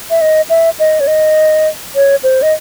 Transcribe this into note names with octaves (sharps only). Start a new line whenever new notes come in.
E5
D#5
E5
D#5
C#5
D#5
C#5
C5
D#5